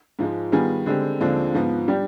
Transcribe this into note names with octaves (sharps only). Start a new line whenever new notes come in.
G#2 F3 G#3
D#3 G3 B3 F4 G#4
D3 G#3 C4 G4
D#2 D3 F3 G#3 C4
G#2 F3 B3
G3 D4 G4